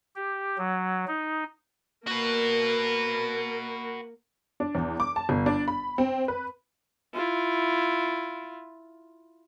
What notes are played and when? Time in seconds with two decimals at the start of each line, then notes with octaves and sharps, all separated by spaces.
0.16 G4
0.58 F#3
1.07 D#4
2.07 A#3 F#4 A#4 B4
4.60 D4
4.75 E2
5.00 D6
5.16 A5
5.29 G1
5.46 D4
5.68 B5
5.98 C4
6.28 B4
7.14 E4 F4